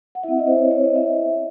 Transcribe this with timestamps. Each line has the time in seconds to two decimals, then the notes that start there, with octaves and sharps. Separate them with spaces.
0.15 F#5
0.23 C4 E4 E5
0.39 D#5
0.47 C5
0.56 C#5
0.71 C#5
0.84 D#5
0.96 E5